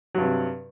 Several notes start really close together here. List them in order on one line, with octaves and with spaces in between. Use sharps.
F#3 G2 C3